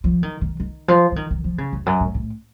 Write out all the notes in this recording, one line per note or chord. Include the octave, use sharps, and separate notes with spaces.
F3
D#3
D#3
D#3
F3
F3
D#3
D#3
F3
C#3
F2
F#2
A2
A2